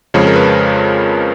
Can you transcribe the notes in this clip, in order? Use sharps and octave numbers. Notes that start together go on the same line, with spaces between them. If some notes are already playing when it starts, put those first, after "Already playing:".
F2 C#3 F3 G#3 C#5
A#4
B4